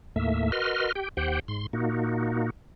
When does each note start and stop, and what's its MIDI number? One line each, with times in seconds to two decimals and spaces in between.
0.16 0.51 39
0.16 0.51 45
0.16 0.51 57
0.16 0.51 58
0.16 0.51 76
0.52 0.92 66
0.52 0.92 70
0.52 0.92 71
0.52 0.92 75
0.52 0.92 84
0.52 0.92 89
0.95 1.08 67
0.95 1.08 79
1.17 1.40 39
1.17 1.40 67
1.17 1.40 72
1.17 1.40 78
1.17 1.40 79
1.48 1.66 44
1.48 1.66 84
1.73 2.50 46
1.73 2.50 58
1.73 2.50 63
1.73 2.50 66